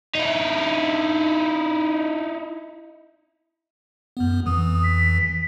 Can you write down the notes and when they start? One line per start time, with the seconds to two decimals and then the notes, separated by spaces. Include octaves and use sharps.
0.15 D#4 E4
4.17 F#2 B3
4.46 F2 E3 D#6
4.83 B6